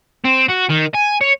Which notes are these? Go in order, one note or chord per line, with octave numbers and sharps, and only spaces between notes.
C4
F#4
D#3
G#5
C#5